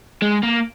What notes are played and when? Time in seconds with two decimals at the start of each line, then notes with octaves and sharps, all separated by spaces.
0.22 G#3
0.43 A#3